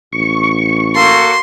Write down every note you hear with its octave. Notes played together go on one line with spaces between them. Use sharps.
A1 C#6
A#3 F#4 A4 C6